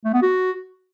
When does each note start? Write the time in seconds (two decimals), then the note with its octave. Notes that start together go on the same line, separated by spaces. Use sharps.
0.05 A3
0.13 B3
0.22 F#4